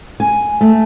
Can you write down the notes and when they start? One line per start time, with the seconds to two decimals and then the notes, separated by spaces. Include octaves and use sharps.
0.20 G#5
0.61 A3